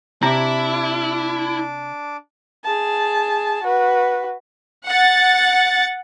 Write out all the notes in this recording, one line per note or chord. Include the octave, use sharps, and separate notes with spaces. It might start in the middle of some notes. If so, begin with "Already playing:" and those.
C3 D4 E4 A#5 D6
G#4 A5
F#4 B4
F#5 A6